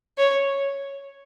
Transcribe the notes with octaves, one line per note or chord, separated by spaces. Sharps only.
C#5